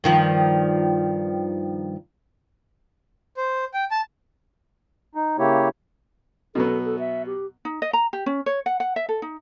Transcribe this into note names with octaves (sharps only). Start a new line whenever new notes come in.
G2 D#3 F3
C5
G5
A5
D#4
C#3 A#3 E4 G4 C#5
B2 F#3 B3 A4
A4
E5
G4
D#4
D#5
A#5
G4
C#4
C#5
F#5
F#5
E5
A4
D#4